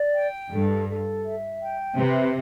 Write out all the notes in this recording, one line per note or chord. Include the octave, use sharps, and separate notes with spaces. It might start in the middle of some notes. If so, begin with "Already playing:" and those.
Already playing: D5
G5
G2 A4
A4
E5
G5
C3 B4